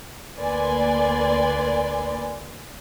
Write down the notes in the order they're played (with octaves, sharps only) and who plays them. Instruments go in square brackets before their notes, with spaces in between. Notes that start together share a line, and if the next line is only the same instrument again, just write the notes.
[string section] D2 A#3 B4 D5 G#5 C6